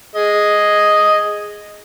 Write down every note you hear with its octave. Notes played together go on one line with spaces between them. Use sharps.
G#4 D#5